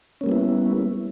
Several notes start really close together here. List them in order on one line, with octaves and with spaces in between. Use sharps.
C#4 A#3 G3 B3 E4